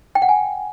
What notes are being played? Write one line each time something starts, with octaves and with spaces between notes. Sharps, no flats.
G5
F#5
G#5